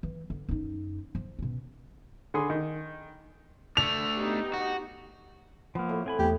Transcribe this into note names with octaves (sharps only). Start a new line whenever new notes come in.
E3
D3
F#2 D#4
F3
B2 C#4
D3 G#4 G#5 B5 C6 D#6
D#3
A3 D4 F7
B3 D#4 G4
F#4
F3 A#3 B3
A2
C4 G#5 B5
E2 A3 G4